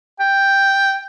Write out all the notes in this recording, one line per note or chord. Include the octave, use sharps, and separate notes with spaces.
G5